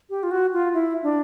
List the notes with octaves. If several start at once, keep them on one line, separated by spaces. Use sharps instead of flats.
G4
F4
F#4
F4
E4
D4